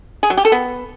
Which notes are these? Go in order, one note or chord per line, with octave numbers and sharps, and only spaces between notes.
G#4
F#3
G4
A4
B3